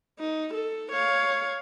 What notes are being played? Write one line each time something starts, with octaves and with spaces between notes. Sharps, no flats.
D#4
A4
C#5 F5